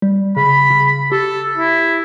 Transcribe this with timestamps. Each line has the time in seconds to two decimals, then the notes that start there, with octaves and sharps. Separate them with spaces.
0.02 G3
0.37 C#3 B5
0.70 C#3
1.12 G4 A4
1.57 E4